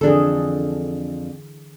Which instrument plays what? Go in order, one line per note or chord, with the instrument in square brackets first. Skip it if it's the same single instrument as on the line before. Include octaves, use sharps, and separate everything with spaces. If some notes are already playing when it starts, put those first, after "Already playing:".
[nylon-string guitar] F2 D4 A4 [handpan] D3 E3 G#4